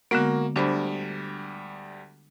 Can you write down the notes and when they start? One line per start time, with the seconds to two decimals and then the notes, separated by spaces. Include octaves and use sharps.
0.11 D3 G#3 A#3 B3 F#4
0.56 D2 G3 D4 C5 B5